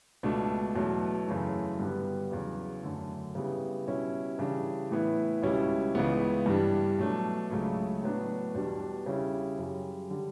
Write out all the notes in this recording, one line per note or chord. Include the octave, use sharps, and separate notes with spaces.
C#2 B2 A3 D4
E2 B2 F#3 A3
F#2 C#3 E3 A3 E4
G2 D3 G3 B3
E2 C#3 F#3
F#2 D3 A3
C#3 G3 B3 E4
B2 G3 C#4 E4
C#3 E3 G3 D4
A2 E3 B3 E4
C#2 B2 G3 C#4 E4
C#2 C#3 E3 B3
G2 E3 G3 D4
B2 F#3 A3 D4
C#2 C#3 F#3 A3
A2 F#3 B3 D4
E2 B2 G3 D4
C#3 G3 C#4 E4
F#2 C#3 G3
D3 G3